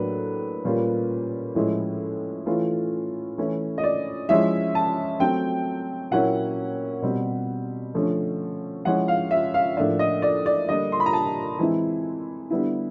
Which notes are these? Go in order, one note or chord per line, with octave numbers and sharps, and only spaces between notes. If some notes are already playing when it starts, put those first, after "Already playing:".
Already playing: A2 F#3 A#3 D4 B4
A#2 G3 A#3 C#4 F4
A2 F3 G#3 C#4 E4
E3 A3 C#4 F4
E3 A3 C#4 E4
D#5
D5
F3 G#3 C#4 E4 E5
A5
F#3 A3 C4 G5
A#2 F#3 A#3 C#4 E4 F#5
B2 G3 C4
D3 F3 A3 C#4
F3 G#3 C#4 E4 F#5
F5
E5
F5
A2 F3 A#3 D4 E5
D#5
D5
D5
D3 G3 A#3 D4 D#5
C6
B5
A#5
A5
E3 G#3 C4 E4
D3 G3 B3 E4